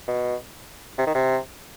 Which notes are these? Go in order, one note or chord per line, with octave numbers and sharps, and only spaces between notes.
B2
C3
D#3
C3